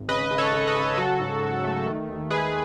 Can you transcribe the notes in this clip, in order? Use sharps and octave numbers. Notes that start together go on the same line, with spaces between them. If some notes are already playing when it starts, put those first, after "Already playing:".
Already playing: G#1
C#3 B4 D#5
C#3
A4 C#5
C#3
B4 D#5
C#3
F#3 F#4 A4
G#2
F#3
A3
D#3
D#2
G#3 G#4 B4